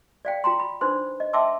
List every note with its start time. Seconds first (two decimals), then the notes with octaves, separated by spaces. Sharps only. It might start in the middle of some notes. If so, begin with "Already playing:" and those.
0.25 D5 F5 G5
0.44 F4 G5 A#5 C6
0.60 B5
0.81 D4 D#4 B4 C5 C6
1.20 D#5
1.33 E5 G5 A5 C6 D6 E6